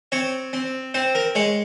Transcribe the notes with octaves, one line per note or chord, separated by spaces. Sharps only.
C4 C#5
C4
C4 C5
A#4
G#3 C#5